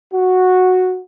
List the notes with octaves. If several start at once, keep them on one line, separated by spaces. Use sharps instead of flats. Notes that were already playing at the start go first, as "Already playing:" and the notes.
F#4